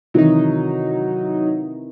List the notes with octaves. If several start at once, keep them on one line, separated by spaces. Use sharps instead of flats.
C3 D#3 E3 F#3 D#4